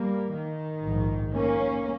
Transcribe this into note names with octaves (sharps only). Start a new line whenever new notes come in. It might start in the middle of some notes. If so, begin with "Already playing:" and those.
Already playing: G3 A#3
D#3
A#1 G#2
A#3 C#4